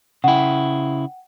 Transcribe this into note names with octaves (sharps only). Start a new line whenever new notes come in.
C#3 E4 F#5 G5